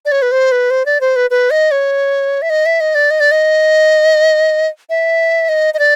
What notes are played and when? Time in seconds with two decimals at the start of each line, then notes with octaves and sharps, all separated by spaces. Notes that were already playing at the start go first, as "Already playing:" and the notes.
0.05 D5
0.12 C#5
0.22 B4
0.32 C5
0.52 B4
0.70 C5
0.86 D5
1.01 C5
1.16 B4
1.30 B4
1.50 D#5
1.71 C#5
2.42 E5
2.50 D#5
2.66 E5
2.80 D#5
2.95 D5
3.10 D#5
3.20 D5
3.31 D#5
4.89 E5
5.49 D#5
5.74 D#5
5.79 D5